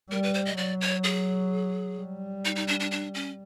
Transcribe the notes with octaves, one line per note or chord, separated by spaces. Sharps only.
G3 A#4
B4
C5
D#5
F#3 D5
C#5
G#4
G3
D#4
D#4
D4
D4
D4
C#4